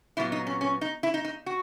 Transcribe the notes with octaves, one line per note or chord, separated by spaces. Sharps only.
A#2 F#3 B3 E4
D#4
C#4
C#4
D#4
E4
D#4
D#4
F#4